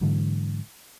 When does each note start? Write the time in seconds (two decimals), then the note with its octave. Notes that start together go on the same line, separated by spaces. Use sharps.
0.01 G#2 D3 E3 F#3